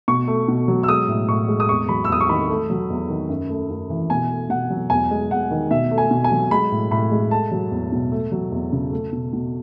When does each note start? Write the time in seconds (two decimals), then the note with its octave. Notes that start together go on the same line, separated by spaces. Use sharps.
0.08 B2 C#6
0.28 A3
0.48 B2
0.68 F#3
0.83 E6
0.88 G#3 D#6
1.08 A2
1.28 A2 C#6
1.48 G#3
1.60 D#6
1.69 E2 C#6
1.89 F#3 B5
2.04 E6
2.09 E2 D#6
2.21 C#6
2.29 D#3 B5
2.50 A3
2.70 F#3
2.90 E2
3.09 D#3
3.29 F#2
3.50 A3
3.70 F#2
3.90 E3
4.10 B2 G#5
4.30 A3
4.50 B2 F#5
4.70 F#3
4.90 E2 G#5
5.11 G#3
5.30 E2 F#5
5.51 D#3
5.71 B2 E5
5.91 A3
5.98 G#5
6.11 B2
6.24 G#5
6.31 F#3
6.51 G#3 B5
6.72 A2
6.91 A2 B5
7.12 G#3
7.31 A3 A5
7.52 F#3
7.72 E2
7.92 B2
8.12 A3
8.32 F#3
8.52 E2
8.72 C#3
8.92 A3
9.13 B2
9.33 B2